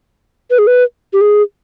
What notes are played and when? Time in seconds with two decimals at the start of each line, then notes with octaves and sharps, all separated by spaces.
0.51 B4
0.59 G#4
0.67 B4
1.13 G4
1.21 G#4